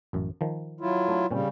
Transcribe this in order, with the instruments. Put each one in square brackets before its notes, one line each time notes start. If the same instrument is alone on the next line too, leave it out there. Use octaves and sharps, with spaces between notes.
[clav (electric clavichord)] A1 F#2
D#3 F3
[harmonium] F#3 E4 F4
[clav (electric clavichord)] A3 D4
[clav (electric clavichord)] A#2 C4 C#4 [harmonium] C#3 G3